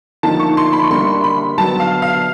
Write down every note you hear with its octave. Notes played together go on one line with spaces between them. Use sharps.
D3 F3 A#3 D#4 A5
C#6
C6
B5
C#6
D3 G3 A#3 D4 C6
B5
D3 F#3 B3 A5
F5
F5